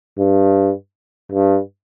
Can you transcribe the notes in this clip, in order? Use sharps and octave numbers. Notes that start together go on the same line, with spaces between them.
G2
G2